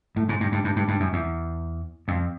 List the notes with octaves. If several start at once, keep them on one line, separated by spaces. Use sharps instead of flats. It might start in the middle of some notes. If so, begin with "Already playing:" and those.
A2
G#2
G2
G2
G2
G2
G2
F#2
E2
F2